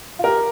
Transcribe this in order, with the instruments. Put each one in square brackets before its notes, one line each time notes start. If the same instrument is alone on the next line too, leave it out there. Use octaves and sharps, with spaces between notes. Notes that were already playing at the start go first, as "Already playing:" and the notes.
[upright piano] F4
[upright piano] G4 [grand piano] A#4